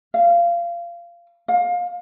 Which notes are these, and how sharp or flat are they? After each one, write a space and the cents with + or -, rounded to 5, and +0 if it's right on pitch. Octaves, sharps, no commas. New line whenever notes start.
F5 -20
F5 +25